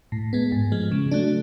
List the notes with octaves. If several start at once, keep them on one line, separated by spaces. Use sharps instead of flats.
A2
G#3 B3
G#2
F3 G#3
C#3
F#3 A3 D4